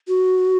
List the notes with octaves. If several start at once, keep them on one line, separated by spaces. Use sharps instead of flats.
F#4